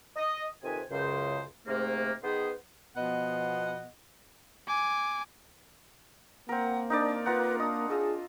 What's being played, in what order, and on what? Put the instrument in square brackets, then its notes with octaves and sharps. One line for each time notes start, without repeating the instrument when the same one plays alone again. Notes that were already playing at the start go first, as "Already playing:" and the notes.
[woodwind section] D#5
F2 C3 D#3 C4 B4 G#5
C#2 F#2 C#3 C5
G#2 C3 A3 A#3
D#3 B3 G#4 C5
[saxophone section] B2 F3 B3 D#5 F#5
[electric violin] G#5 D6
[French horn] A#3 [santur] C4 A#4 [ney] F#5
[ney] D4 [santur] D#4 A#4 D5
[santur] F4 A#4 F#5 [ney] B4
[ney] D4 [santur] D#5 D#6
[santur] F4 D#5 E6 [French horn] G#4